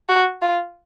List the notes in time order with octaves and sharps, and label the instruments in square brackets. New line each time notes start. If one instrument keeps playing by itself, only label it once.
[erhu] F#4
F4